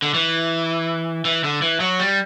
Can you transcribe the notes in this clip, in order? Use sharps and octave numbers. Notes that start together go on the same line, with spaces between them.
D3
E3
E3
D3
E3
F#3
G3